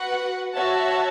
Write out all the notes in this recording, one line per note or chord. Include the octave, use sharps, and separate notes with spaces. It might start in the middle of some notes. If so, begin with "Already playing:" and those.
Already playing: F#4 B4 F#5
F#4 C#5 E5 A5